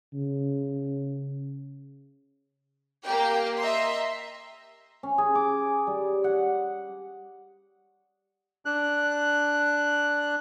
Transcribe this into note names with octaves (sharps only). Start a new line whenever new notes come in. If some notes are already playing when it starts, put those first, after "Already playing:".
C#3
A#3 G4 G5
D#5 E5 A#5 C6
C#4
G#4
D6
G3
F#5
D4 F#6